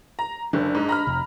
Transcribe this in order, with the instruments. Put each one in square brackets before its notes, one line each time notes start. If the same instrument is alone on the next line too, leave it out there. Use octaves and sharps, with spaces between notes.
[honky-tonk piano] A#5
[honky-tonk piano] F#1 D3 [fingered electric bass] D4
[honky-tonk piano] G#2
A#5 B5 F6
[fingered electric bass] F2 C3